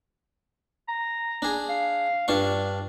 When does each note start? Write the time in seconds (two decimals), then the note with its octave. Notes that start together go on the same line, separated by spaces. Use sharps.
0.88 A#5
1.42 D4 G#4
1.69 F5
2.28 G2 D4 F4 C#6